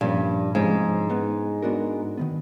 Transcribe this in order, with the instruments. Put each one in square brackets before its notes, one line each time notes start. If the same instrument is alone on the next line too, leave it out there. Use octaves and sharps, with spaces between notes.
[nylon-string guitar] G2 [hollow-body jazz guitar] A#2 F3 A#3 C#4
[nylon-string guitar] G#2 [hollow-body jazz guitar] C3 F3 G#3 C#4
[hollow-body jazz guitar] G#3 B3 D#4
G#3 B3 D4 F#4 A#4
D#3 F#3 B3